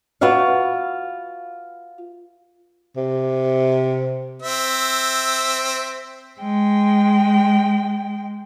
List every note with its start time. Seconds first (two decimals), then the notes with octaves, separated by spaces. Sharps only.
0.21 F4 F#4 B4 E5 F5
2.96 C3
4.42 C4 E5
6.40 G#3 G5